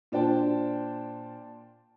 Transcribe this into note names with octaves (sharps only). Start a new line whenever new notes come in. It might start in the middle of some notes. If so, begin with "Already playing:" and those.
A#2 D4 C5 G5 A5